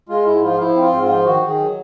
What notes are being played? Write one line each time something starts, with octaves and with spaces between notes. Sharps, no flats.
G#3 F4
G#2 E4
F3 F4
F3 E4
C4
F4
G#2
F4
F3
D#3 F#4
D#3
G#4
F#3